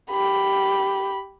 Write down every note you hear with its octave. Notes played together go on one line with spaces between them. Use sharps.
G4 B5